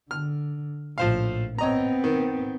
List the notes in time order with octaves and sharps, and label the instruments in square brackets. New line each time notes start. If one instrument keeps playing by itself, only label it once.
[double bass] D3 [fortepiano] F6
[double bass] A#1 A2 [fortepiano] F3 C5 F5
[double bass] B3 C4 [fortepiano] C#5 D#5 A#5
[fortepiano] D#3